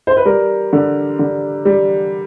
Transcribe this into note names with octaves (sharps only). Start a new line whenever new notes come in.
C5
B4
G3 A#4
D3
D3
G3